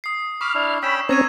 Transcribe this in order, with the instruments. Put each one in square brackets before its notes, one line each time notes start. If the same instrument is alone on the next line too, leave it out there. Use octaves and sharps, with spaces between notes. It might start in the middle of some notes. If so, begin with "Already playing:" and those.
[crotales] D#6 C7
[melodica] B5 D6 [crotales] C#6 [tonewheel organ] F6
[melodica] D4 E4
[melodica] C#4 G5 [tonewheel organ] B5 [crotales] E6 E7
[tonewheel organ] C4 C#4 [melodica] C#5 A#5 [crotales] C#6 G#6 D#7